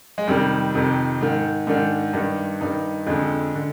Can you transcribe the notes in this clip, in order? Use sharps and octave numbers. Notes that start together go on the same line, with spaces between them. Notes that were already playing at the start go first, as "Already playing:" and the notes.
G#3
F2 C3 D#3 G3
F2 C3 D#3
G#2 D#3
G#2 D#3 D4
G2 D#3
G2 D#3 D#4
F2 D3 G#3
D3